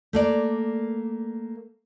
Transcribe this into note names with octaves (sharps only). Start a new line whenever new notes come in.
A3 A#3 D5